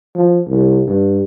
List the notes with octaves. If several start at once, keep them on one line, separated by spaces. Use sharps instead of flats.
F3
C2
G2